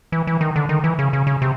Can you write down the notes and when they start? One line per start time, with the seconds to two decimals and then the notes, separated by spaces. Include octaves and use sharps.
0.12 E3
0.27 E3
0.41 D#3
0.56 D3
0.69 D#3
0.84 E3
0.99 C#3
1.13 C#3
1.27 C#3
1.42 C3